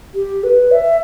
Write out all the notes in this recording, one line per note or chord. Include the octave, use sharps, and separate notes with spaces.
G4
B4
E5